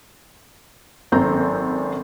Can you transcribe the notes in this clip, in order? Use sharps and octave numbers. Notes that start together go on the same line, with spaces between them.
G#1 F#2 C4 A4 A#5 G6